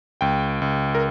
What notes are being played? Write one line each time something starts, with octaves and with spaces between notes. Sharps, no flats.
C#2 G5
C#2
A#4